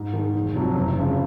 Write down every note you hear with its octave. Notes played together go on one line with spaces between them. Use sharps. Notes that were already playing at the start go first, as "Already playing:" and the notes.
Already playing: G#2
D#3 G#3
F1
F2 C3 F#3
F#1
F2 C#3 G#3